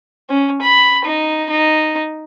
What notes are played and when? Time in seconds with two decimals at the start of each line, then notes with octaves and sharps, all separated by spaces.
0.30 C#4
0.62 B5
1.05 D#4
1.50 D#4